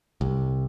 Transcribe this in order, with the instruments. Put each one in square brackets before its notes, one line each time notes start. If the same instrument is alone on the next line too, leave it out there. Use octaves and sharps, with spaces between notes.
[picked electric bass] C2